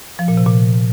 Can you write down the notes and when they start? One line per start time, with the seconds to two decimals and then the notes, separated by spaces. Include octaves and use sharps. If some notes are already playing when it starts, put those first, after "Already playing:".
0.19 F3
0.28 A#2
0.37 C3
0.47 A#2